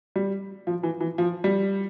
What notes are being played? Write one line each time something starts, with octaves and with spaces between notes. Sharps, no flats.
G3
F3
E3
E3
F3
G3